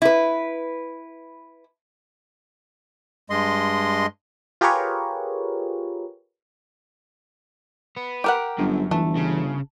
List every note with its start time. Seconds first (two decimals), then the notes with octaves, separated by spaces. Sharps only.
0.02 E4 B4
3.30 G2 G#3 D#5 C6
4.61 F4 G4 G#4 A#4 B4 C#5
7.96 B3
8.24 G4 A#4 F#5
8.58 G1 F#2
8.91 G1 E3 A3
9.16 C#3